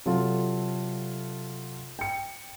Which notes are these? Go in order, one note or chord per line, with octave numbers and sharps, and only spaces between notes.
C3 F#3 F4 A4
G5 C#7